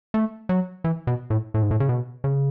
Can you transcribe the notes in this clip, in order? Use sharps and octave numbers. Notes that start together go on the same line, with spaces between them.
A3
F#3
E3
B2
A2
A2
G#2
A2
C#3
B2
C#3